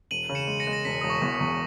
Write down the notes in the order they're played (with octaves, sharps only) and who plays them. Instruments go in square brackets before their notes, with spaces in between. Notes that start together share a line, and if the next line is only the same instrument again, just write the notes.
[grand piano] E1 [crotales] D#7 F#7
[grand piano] C#3
[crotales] C#7 E7
[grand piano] G#3
[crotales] A#6 C#7
[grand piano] G#3
[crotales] A#6
[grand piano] E1 [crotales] B6
[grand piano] E1 [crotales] D#6
[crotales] C#6
[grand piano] E2
[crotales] D#6
[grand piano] E2